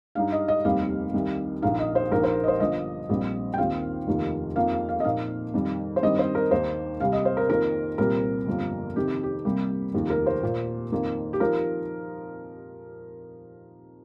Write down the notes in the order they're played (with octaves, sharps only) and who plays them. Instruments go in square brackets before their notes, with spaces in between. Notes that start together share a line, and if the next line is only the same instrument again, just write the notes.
[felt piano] G2 G3 D#4 F5
D#5
D#5
F1 D#2 D#3 G3 C4 F5
C2 C3 D#3
A#1 A#2 A#3 D#4 F5
D#5
C5
A#1 A#2 A#3 D#4 A#4
C5
D#5
C5
G1 G2 F3 D#5
A#1 A#2 G3 C4 F4
G5
D#2 D#3 C4 F4 F5
F1 D#2 D#3 A#3 F4
F2 F3 A#3 D#4 F5
F5
F5
D#5
A#2 F3 A#3 D#4 F5
F2 D#3 G3
C5
G2 D#3 G3 C4 D#5
C5
A#4
D#2 D#3 A#3 C5
C2 C3 G3 F5
D#5
C5
A#4
F2 D#3 A#3 F4 A#4
C2 A#2 G3 C4 A#4
G1 F2 F3 A#3
F2 C3 D#3 G4
G4
C2 C3 G3 A#3
F1 D#2 D#3 A#3 F4
A#4
C5
A#2 A#3 F4
F2 D#3 A#3 F4
G4
F3 D#4 A#4